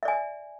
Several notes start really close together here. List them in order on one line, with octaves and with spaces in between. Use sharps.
E5 D5 G#5